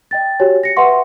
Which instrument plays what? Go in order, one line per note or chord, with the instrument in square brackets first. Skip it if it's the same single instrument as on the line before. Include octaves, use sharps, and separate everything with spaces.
[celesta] D#5 G5 A6
F#4 G4 C#5 G#5
A#6 C#7
B4 E5 F#5 C6 C#6